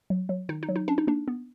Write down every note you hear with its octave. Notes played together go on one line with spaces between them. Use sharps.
F#3
F#3
D#3 D#4
D#4
F#3
D#4
C#4 D4
D#4
A#3 D4
B3